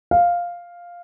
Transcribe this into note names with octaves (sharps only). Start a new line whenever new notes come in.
F5